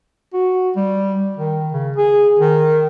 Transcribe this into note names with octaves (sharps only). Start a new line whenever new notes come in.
F#4
G3
D#3
C#3
G#4
D#3